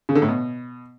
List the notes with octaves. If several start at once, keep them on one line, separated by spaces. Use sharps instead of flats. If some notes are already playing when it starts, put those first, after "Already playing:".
C#3
D3
A2
B2